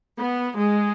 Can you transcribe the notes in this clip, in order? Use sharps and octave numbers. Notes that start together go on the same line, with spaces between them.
B3
G#3